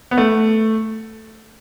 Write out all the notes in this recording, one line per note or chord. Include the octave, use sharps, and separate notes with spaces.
B3
A3